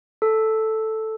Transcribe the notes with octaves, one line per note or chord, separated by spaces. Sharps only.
A4